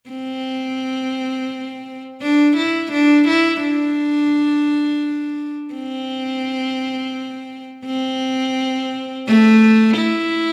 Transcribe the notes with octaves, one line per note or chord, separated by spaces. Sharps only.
C4
D4
E4
D4
E4
D4
C4
C4
A3
E4